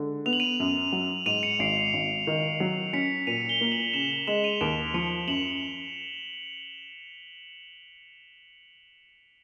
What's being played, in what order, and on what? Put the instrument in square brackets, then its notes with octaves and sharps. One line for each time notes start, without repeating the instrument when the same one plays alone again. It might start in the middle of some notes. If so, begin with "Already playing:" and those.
Already playing: [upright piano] D3 G#3
[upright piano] B3 [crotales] F7
[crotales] F#7
D#7 F7
[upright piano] F#2
F#3
[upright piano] G#2 [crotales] D#7 F7
[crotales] C#7 D#7
[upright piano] G#1 [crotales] C7 D7
[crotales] C7
[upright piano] G#1
D#3
[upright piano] F#3 [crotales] C7
[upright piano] C#4 [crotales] B6 C#7
[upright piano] A#2 [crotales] D#7 F7
[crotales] F7 G7
[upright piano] A#3
[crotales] E7 F#7
[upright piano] C#3 [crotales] E7 F#7
[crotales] E7 F#7
[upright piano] G#3 [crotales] E7 F#7
[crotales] D#7 F7
[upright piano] D#2 [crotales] D7 E7
[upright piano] F3 [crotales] C#7 D#7
[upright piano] F#2 [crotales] E7 F#7